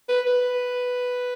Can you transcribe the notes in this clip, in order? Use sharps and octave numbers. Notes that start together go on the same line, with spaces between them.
B4
B4